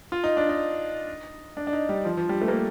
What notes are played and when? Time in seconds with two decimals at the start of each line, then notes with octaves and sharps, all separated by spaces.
0.12 F4
0.24 D#4
0.37 D4
0.49 D#4
1.57 D4
1.67 D4
1.73 D#4
1.89 G3
2.05 F3
2.17 F3
2.29 G3
2.42 A3
2.48 A#3